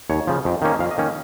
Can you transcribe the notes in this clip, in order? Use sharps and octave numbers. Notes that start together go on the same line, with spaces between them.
D#2 C#5
C#3 F3
F2
D#3 A#3 C#4
F2 F5
D#5
D#3 A#3 C#4